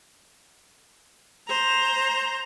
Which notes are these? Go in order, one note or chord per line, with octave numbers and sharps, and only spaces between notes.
C5 A#5